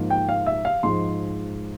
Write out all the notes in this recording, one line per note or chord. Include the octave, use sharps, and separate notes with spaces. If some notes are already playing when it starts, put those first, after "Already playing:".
Already playing: G#2 F3 A#3
G5
F5
E5
F5
G#2 F3 G#3 C6